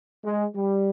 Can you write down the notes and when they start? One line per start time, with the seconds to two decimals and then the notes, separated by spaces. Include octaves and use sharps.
0.25 G#3
0.56 G3